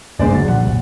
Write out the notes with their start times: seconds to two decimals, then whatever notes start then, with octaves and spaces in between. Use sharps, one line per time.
0.19 D#1 C2 F#2 G#3 C5 D5
0.32 D3 F#3 A6
0.48 A#2 F3 G3 F#5
0.64 F#1 C2 A#2